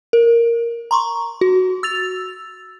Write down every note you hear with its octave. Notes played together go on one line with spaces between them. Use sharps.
A#4
A#5 C6 C#6
F#4
E6 A6 F7